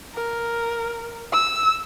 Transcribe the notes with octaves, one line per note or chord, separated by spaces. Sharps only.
A#4
E6